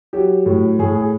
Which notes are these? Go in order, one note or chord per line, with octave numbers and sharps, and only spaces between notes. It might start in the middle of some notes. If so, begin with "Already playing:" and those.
F#3 G4
A2
A2 G#4
G#4